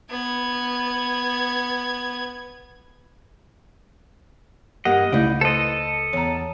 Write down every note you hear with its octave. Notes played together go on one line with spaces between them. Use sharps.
B3 G#6
G2 A#3 G4 D#5 F#5
C#2 A3 D#4 E4 D5
A4 B4 C5 D#5
E2 C#5 A#5